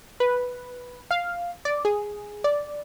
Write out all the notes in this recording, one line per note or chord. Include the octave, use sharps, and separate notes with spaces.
B4
F5
D5
G#4
D5